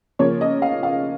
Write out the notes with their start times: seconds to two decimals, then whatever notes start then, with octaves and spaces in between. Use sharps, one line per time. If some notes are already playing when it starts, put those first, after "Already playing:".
0.19 C#3 F3 A#3 C#4 C#5
0.41 D#5
0.62 F5
0.83 F5